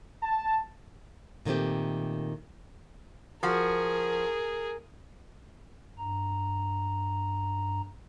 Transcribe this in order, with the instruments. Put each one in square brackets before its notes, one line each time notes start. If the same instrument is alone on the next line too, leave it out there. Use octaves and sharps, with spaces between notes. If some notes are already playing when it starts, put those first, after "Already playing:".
[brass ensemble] A5
[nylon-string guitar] A#2 D#3 A3 C4 G4
[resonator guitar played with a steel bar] F3 F#4 [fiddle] G#4 A#4
[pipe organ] G2 A#5